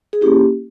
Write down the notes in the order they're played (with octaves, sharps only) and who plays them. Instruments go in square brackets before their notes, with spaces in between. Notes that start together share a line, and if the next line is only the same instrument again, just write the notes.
[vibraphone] G#4
A#3 C#4 E4 G4